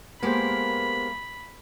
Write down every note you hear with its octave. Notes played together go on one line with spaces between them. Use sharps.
G#3 A#3 B3 G4 A#4 C5 B5